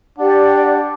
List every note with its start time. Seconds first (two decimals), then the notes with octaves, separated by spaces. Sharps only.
0.18 D4 G4 D5 F#5